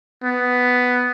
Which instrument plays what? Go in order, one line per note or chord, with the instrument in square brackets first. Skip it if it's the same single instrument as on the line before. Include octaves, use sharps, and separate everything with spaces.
[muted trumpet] B3